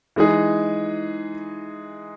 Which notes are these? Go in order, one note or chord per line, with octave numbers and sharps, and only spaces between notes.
E3 G#3 D#4 G#4